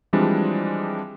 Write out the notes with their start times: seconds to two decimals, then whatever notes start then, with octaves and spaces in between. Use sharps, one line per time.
0.13 E3 F3 G3 G#3 C4 D4